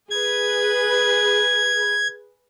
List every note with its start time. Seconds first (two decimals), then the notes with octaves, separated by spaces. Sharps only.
0.10 G#4 B4 G#6